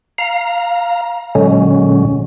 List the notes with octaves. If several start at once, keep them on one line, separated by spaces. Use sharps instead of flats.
F5 A#5
A#2 D3 F#3 G#3 C#4